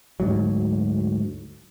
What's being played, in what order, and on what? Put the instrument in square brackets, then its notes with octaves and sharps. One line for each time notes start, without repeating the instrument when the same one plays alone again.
[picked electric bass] D2 G#2 F#3